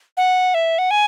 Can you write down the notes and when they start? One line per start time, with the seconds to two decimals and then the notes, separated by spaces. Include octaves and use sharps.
0.17 F#5
0.54 E5
0.78 F#5
0.91 G#5